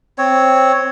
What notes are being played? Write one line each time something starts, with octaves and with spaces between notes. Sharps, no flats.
C4 C#5